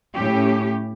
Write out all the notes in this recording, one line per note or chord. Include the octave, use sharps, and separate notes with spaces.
A2 C#4 G4